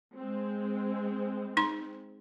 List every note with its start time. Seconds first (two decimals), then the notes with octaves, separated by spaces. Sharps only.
0.15 G#3 C4
1.57 D#4 C6